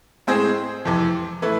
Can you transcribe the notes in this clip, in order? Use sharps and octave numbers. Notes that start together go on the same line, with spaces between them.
A2 G#3 C4 G#4 C5
F2 C3 E3
A2 E3 A3 E4 B4